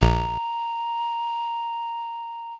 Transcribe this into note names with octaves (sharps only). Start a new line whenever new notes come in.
A#1 A#5